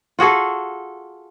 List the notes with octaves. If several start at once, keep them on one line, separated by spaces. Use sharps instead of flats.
F4 F#4 G#4 A4